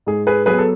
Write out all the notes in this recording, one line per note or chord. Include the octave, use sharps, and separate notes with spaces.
G#2 G#4
G#4 B4
F#3 B3 G#4 B4
A4